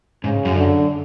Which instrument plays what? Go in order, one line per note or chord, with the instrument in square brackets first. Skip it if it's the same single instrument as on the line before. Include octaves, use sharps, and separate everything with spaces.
[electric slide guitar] G#2 [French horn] C#3
[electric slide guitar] F#2
[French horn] D3